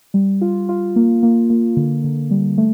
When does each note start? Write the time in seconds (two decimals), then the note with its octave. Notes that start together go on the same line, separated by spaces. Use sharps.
0.14 G3
0.41 F4
0.69 F4
0.96 A#3
1.23 A#3
1.50 A#3
1.77 D3
2.04 D3
2.31 G3
2.58 A3